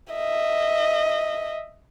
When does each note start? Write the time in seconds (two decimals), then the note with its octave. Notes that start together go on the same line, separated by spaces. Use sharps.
0.13 D#5 E5